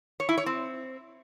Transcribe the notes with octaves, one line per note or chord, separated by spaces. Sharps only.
C#5
E4
C#5
C4